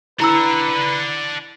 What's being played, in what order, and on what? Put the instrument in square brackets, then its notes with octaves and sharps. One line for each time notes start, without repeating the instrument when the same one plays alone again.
[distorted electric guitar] D4 F#5 [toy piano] E4 A#5 E6 [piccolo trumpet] B4